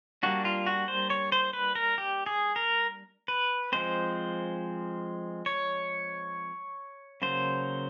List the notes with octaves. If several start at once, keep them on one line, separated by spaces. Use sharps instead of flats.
G3 A#3 D4 F#4
F4
F#4
C5
C#5
C5
B4
A#4
G4
G#4
A#4
B4
F3 G#3 C4 C5
C#5
C#3 F#3 A#3 C5